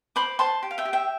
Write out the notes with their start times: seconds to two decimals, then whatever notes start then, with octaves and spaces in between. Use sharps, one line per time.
0.16 C5 B5 D6
0.39 C5 A5 C6
0.63 G4
0.71 F5
0.78 E5 G5
0.85 G4
0.93 E5 G5